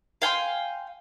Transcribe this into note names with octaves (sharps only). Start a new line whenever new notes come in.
F5 G5 G#5 C6